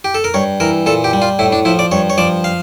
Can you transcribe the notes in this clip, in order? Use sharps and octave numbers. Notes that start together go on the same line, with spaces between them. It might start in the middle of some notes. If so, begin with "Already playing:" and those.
G4
A4
A#4
G2 C#5
E3 A#4
A#2 A4
G4
G3
F4
A2 E4
D4
F3 E4
D5
G2 C#5
C#5
F3 D5
F5